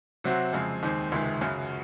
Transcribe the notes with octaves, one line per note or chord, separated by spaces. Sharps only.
C3 F#3 C4 F#4
F2 C#3 G#3 C4
D#2 D#3 G#3 C4
C#2 C3 D#3 G#3
F#2 C#3 F#3